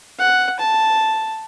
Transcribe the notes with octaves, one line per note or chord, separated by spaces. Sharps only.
F#5
A5